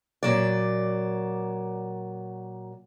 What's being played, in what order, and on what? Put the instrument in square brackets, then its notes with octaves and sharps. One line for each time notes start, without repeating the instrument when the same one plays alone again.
[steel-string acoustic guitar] A#2 F#3 D5